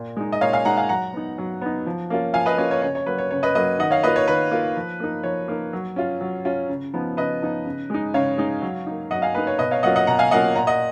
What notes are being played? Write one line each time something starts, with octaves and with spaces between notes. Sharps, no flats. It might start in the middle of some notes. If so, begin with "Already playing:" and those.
Already playing: A#2
G#3 D#4
D#5
A#2 C#5 F5
F5 G#5
G#3 D#4 F#5 A#5
F5 G#5
F#3 F#5 A#5
B3 D#4
F#3
B3 D#4
F3
A#3 C#4 F4
F3 F5 G#5
B4 D#5
A#3 C#4 F4 C#5
C#5
C#3 C#5
C#5
F#3 A#3 B4
C#5
C#3 C#5
B4 D#5
F#3 A#3 B4 D#5
D#3 D#5 F#5
C#5 F5
A#3 F4 B4 D#5
C#5
D#3 B4
A#3 F4
F3
A#3 D#4
F3 C#5
A#3 D#4
F#3
C#4 F4
F#3
C#4 F4
C#3
F3 B3 D#4
C#3 B4 D#5
F3 B3 D#4
C#3
G#3 D#4
C#3 C#5 F5
G#3 D#4
F#3
A#3 D#4
F#3 D#5 F#5
F5 G#5
A#3 D#4 B4
C#5
B2 B4 D#5
C#5 F5
F#3 A#3 C#4 F4 D#5 F#5
D#5 F#5
B2 F#5 A#5
F5 G#5
F#3 A#3 C#4 F4 D#5 F#5
A#2 F#5 A#5
D#5 F#5